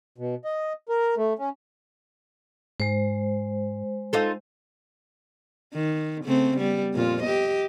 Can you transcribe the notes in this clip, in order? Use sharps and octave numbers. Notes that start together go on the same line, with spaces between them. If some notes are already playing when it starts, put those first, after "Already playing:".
B2
D#5
A#4
A3
C#4
G#2 G#3 C5
D#4 F4 A4
D#3
C#3 A3 C4
G3 B3
F2 A#2 F4
G4 D#5